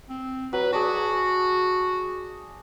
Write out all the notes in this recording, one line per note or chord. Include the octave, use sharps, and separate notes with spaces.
C4
F#3 B4
F#4 G#4 D5 A5